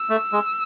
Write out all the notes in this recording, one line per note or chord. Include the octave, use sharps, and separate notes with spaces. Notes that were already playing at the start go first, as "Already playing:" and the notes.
Already playing: E6
A3
G#3